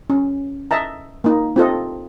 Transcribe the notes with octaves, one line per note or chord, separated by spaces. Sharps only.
C#4
D#5 E5 A5 A#5
A#3 D#4
C4 F4 A4 D#5